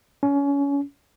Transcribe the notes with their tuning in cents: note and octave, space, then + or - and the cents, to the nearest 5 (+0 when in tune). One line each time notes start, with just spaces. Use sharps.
C#4 +25